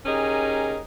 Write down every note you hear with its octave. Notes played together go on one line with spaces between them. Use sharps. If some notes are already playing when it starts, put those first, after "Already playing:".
C#4 D#4 G4 G#4 A#4